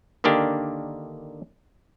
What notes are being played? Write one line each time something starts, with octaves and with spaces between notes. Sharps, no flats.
D3 D#3 A#3 D4 G4